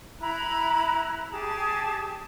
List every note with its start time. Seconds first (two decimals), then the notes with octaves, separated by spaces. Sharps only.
0.21 E4 A#5 B5 F#6
1.32 G4 G#4 A5